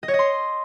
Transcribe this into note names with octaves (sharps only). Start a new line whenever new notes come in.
D#5
C#5
D#5
C6